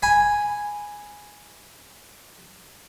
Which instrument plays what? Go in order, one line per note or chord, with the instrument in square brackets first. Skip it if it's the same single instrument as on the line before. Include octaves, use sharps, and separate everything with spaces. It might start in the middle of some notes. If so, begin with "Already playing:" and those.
[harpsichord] G#5 B5